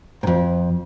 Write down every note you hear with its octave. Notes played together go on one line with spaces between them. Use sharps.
F2 G#2